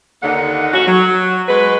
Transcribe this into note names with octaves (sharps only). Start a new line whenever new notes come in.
D#2 D3 A#3 D#4 F#5
C#4 F#4
F#3
G#3 F#4 B4